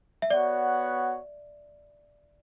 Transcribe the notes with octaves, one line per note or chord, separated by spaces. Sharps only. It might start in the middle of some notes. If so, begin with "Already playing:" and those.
E5
B3 F#4 C#5 D5 F#5